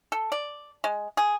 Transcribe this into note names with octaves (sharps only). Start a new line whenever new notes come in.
A4
D5
G#3
G#4